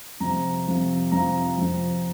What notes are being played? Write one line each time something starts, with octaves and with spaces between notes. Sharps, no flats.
F2 C3 F3 A#5
F2 C3 F3
F2 C3 F3 A#5
F2 C3 F3